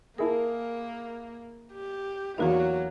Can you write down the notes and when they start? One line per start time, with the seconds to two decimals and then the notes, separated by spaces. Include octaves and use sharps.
0.18 A#3 E4 G#4 A#4 A5
1.73 G4
2.38 E2 F#3 A#3 D#4 E4 F#4 G#4